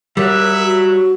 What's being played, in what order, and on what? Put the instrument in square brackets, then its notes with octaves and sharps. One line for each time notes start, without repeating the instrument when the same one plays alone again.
[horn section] F#3 [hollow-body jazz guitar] G3 [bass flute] A#4 [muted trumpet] E5
[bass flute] F#4